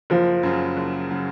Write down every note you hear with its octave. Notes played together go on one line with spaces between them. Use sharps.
F#1 F3
F#2 C#3 F#3
F#1
C#3 F#3